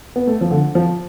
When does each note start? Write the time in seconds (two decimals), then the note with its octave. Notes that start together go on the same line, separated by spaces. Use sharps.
0.16 B3
0.27 A3
0.41 F3
0.51 D3
0.75 F3